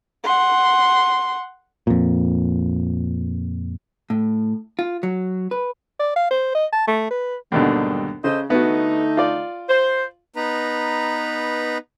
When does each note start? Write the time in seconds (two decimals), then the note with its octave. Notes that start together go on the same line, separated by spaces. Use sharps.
0.25 F#5 C6
1.87 F2 A#2
4.10 A2
4.79 F4
5.03 F#3
5.51 B4
6.00 D5
6.16 F5
6.31 C5
6.55 D#5
6.73 A5
6.87 A3
7.11 B4
7.52 D#2 G#2 B2 D3 D#3 G3
8.24 C#3 A4 C5 D#5
8.50 D3 A3 B3 D#4 F#4
9.17 F4 D5
9.69 C5
10.36 B3 D#4 B4 A#5